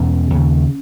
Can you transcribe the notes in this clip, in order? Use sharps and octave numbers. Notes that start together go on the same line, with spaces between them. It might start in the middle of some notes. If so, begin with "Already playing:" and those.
Already playing: E2 B2 C#4
D#2 C#3